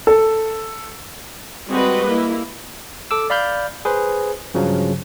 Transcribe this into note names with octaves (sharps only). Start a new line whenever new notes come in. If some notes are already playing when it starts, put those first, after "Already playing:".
A4
G3 G#3 C4 F#4 B4 D#5
A#3 E4
A4 D6 E6
D5 F5 B5 F6 G6
G#4 B4 C5
G2 C#3 F3 F#3